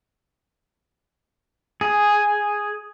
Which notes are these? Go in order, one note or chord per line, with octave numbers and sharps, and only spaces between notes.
G#4